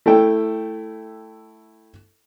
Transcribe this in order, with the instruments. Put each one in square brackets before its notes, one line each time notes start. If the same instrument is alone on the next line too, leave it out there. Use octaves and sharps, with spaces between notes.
[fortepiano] A3 E4 A4 G5